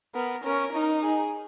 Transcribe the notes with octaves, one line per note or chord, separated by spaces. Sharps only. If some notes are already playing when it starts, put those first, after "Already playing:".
B3 A#4
C#4 A#4
D#4
G#4